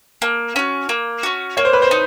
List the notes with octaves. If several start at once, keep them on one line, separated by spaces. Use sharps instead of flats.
A#3
C#4 F#4
A#3
C#4 F#4
A#3 C#5
C5
B4
C5
D#4